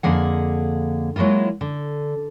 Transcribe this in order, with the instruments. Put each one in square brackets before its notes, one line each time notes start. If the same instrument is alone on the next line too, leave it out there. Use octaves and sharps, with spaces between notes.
[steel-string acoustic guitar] F2 D3 A#3 G#4 F#5
F#3 G#3 A#3 E4 F4
D3